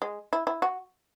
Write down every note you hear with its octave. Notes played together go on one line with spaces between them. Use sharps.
G#3
E4
E4
F#4